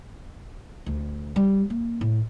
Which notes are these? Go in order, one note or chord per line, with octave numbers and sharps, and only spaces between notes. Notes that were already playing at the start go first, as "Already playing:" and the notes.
D2
G3
A#3
A2